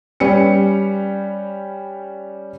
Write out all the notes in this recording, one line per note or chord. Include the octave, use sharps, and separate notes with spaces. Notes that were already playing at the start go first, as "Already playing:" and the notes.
G3 C#4 B4 G5 C#7